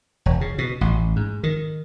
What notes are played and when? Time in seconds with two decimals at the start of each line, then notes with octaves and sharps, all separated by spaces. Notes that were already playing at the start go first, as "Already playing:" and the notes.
0.26 E1
0.41 C#3
0.58 B2
0.81 A1
1.16 G#2
1.43 D#3